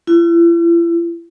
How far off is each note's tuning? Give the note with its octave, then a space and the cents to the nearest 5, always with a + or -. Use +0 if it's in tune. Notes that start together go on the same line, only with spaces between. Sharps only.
E4 +45